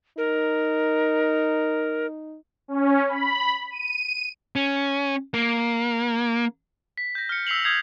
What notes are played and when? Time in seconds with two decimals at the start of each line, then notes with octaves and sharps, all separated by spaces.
0.18 D#4 A#4
2.68 C#4
3.09 B5
3.71 D#7
4.56 C#4
5.34 A#3
6.98 B6
7.15 G6 A#6
7.29 F6 C#7
7.47 E6 B6 C7 F7 F#7
7.64 D#6 F6 G6 G#6 C7 F7